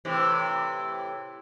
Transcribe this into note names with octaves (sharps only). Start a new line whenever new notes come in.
A2 C3 E3